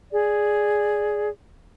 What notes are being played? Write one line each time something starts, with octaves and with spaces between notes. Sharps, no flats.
G#4 D5